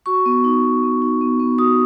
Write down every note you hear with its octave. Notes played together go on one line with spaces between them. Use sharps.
F#4 C#6
B3
D#4
B3
B3
D#4
B3
B3
F#4 D#6